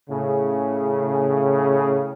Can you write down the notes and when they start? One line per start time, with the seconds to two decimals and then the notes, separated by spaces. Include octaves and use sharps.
0.10 A2 C#3